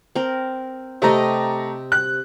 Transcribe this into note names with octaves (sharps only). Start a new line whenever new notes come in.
C4 A#4
C3 A3 G4 D#5 A#5
F#6